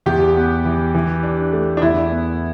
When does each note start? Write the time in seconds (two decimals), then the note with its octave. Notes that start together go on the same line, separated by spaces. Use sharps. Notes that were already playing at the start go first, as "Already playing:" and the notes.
0.06 E2 G4
0.36 B3
0.65 E3
0.94 E3
1.23 D4
1.53 A3
1.77 D4
1.82 E2 E4
2.11 B3